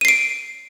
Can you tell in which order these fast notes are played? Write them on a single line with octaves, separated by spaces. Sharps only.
D#7 C7 D7